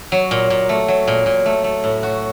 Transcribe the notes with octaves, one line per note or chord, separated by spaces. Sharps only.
F#3
A#2
A#2
A3
F#3
A#2
A#2
A3
A3
A2
F#4